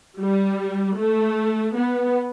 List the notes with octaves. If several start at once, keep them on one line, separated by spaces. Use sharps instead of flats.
G3
A3
B3